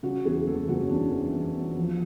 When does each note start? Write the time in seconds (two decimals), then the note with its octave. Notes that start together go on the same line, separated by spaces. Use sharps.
0.03 C#3 F#4
0.25 E2 G#4
0.47 F#1 A4
0.68 F#1 F#4
0.81 C#4
0.89 E2 D4
1.12 E3
1.34 E2
1.55 E2
1.77 F3